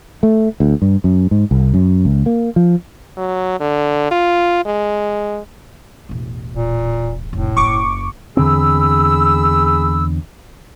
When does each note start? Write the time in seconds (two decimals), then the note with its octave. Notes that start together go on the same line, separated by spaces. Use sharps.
0.23 A3
0.60 D2
0.82 G2
1.04 F#2
1.31 G#2
1.51 C2
1.74 F#2
2.05 C#2
2.26 A#3
2.56 F3
3.17 F#3
3.60 D3
4.11 F4
4.65 G#3
6.09 E1 A1
6.54 D1 A#2
7.33 F1 A2
7.57 F#1 F#2 C#6 D6
8.37 E2 D3 C4 G#4 B5 E6